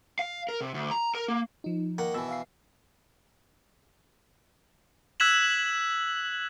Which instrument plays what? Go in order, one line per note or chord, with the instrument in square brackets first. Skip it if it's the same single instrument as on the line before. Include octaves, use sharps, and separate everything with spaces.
[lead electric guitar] F5
A#4
C3
D2
A#5
A#4
A#3
[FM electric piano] F3 D#4
[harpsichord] D#3 A#3 F#5
[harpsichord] B2 E3 [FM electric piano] E6
[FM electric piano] E5 F5 C7
[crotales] E6 F#6 G#6 B6 E7 F#7